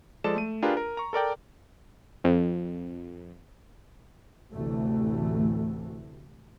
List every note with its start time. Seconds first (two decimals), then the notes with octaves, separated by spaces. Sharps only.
0.24 F3 G#3 A4 D5 A5 E7
0.36 A3 D#7
0.62 D4 F4 G4 G#4 A#4 B4
0.77 A#4
0.97 A#5 C#6
1.13 A4 A#4 D5 G5
2.24 F2
4.52 A1 D2 C3 E3 A3